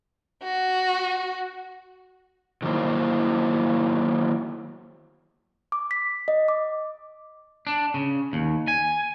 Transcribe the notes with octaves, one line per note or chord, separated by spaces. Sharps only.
F#4
D3 D#3 F#3 A#3 E4 C5
D6
B6
D#5
D6
D4
C#3
D#2
G#5